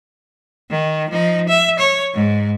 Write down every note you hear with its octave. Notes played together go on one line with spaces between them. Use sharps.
D#3
F3 D#4
E5
C#5
G#2